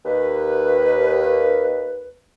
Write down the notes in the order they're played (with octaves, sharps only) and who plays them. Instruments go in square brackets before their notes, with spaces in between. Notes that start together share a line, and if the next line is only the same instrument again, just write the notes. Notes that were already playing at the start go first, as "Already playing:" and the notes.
[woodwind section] D#2 B4